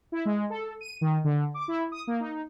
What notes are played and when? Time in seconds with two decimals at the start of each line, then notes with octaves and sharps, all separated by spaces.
0.12 E4
0.25 G#3
0.50 A4
0.81 D#7
1.01 D#3
1.24 D3
1.54 D6
1.68 E4
1.92 D#6
2.07 A#3
2.20 D#4